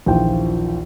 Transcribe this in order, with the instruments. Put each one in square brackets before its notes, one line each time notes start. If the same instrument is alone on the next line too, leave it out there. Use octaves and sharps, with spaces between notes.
[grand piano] A#1 D#2 E3 F4 C5 G5